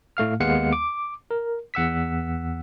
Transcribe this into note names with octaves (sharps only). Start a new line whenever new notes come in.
A2 A3 F5 F6
D#2 G#3 B3 F5 F#5 C#7
D6
A#4
E2 F#5 E6 B6